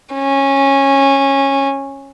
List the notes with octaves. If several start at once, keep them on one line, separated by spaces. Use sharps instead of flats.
C#4